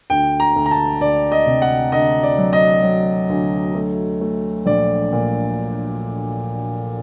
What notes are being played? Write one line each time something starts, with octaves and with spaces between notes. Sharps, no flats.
D2 G5
A#5
D2
A#5
A5
D2 D5
D#5
C3
F#5
D2 D#5
D5
F#3
D#5
F#3
D2
A3
A3
A#1 D5
A#2